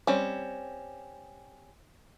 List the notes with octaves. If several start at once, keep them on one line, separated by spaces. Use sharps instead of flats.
G3 C4 C#4